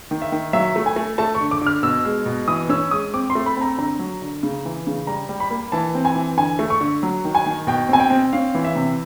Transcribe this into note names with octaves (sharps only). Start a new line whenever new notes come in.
D#3
E5
D#3
F#3 E5
A3
G#5
A3
A3 A5
C#6
D3
D6
D3
F6
B2 E6
G#3
B2
E3 D#6
C#4 E6
G#3 D#6
C4 D6
C6
A3
B5
C4 A#5
D3 A#5
F#3
D3
C#3
E3
C#3
G3 A#5
G3
B5
A#3
E3 A5
C4
G#5
E3
D3 G#5
A3
C#6
D3
F#3
D#3
G#5
D#3
B2 G5
C4 G#5
G5
C4
C#4 F5
E3
E5
C3